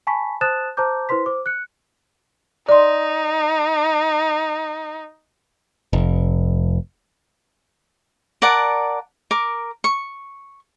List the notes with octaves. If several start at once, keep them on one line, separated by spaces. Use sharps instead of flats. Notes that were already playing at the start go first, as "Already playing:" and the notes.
G#5 A5 B5 C#6 B6
C5 A5 D#6 F#6 A6 E7
C5 A5 A#5 D6 G6
E4 B4 C5 C6 B6
C5 D6
F#6 C#7
D#4 D5 C6
F1
A#4 D5 F#5 A5
A#4 D6
C#6